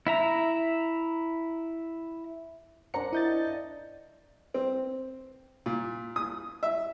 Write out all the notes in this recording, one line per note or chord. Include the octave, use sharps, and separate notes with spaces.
E4 E5 A#5
D4 A#4 C5 F#5 A#5 C#7
E4 D#5 G6 A6
C4
A#2
D#6
E5